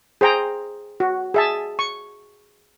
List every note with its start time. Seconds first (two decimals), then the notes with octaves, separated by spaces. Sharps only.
0.21 G#4 C5 G5 A#5
1.00 F#4
1.34 G#4 E5 A5
1.79 C#6